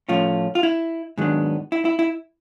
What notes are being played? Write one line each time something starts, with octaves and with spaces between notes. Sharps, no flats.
A2 F3 A3 C#4 F4
F4
E4
G#2 D#3 F#3 B3 D4
E4
E4
E4